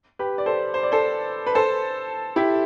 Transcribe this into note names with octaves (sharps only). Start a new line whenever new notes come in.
G4 B4
D5
A4 C5
C5
D5
A4 C5
B4
A4 C5
E4 G4